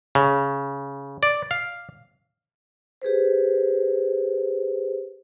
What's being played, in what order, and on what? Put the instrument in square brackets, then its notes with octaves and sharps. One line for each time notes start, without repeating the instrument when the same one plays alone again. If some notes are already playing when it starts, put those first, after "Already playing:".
[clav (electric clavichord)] C#3
D5
F5
[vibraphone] G4 G#4 B4 C5